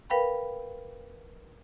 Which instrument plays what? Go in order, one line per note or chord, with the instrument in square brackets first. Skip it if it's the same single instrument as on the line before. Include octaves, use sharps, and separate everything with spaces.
[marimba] A#4 B4 F5 G5 B5